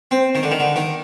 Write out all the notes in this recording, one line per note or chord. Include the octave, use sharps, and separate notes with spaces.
C4
D#3
D3
D#3
D3
D#3